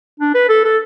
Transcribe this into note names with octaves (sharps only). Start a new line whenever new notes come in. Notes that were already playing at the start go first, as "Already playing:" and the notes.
D4
B4
A4
A4